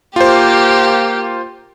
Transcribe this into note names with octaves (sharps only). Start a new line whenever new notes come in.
A#3 F4 G4 C5